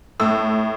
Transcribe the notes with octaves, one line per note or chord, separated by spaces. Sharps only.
A2 E6